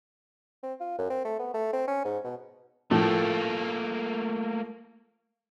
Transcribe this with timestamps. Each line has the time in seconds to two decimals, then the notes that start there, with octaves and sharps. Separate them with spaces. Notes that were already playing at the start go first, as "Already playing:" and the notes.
0.63 C4
0.80 F4
0.98 F#2
1.10 C4
1.25 A3
1.39 B3
1.54 A3
1.73 C4
1.87 C#4
2.05 G#2
2.24 B2
2.91 A2 F3 A3 A#3